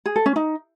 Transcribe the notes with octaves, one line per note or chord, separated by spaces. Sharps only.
G#4
A4
C#4
D#4